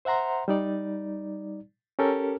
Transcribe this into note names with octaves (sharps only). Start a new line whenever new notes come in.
C5 E5 F#5 A#5 C6
G3 D#4 D5
C#4 G4 A4 A#4